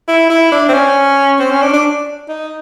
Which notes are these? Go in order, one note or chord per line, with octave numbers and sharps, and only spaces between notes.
E4
E4
D4
C4
C#4
C4
C#4
D4
D4
D#4